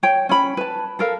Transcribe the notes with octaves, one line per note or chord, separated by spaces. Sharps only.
C#5 G5
C#4 B5
B4 A5
A4 A#4 F5